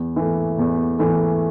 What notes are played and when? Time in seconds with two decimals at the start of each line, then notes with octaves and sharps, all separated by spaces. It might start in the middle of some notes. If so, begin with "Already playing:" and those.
Already playing: E2
0.16 E3 A3
0.58 E2
0.99 E3 A3